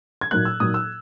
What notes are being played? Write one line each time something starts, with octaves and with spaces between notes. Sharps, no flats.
G#6
A#2 F#3 A#3 D#4 F#6
E6
A#2 F#3 A#3 D#4 D#6
E6